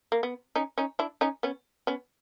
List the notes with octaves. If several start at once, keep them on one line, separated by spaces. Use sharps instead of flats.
A#3
B3
C#4 D#4
C#4 D#4
D4 E4
C#4 D#4
B3 C#4
B3 C#4